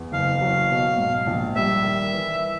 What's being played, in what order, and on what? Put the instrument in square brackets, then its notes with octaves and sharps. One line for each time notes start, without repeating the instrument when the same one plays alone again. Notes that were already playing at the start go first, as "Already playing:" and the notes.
Already playing: [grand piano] E2
[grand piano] F#1 [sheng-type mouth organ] F5
[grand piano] F#3
B2
G#2
A#1
[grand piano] G3 [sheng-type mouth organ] E5
[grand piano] D#3
E3